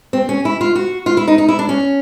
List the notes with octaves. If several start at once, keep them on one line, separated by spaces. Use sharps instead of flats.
C4
C#4
E4
F4
F#4
F4
E4
D#4
D#4
E4
D4
C#4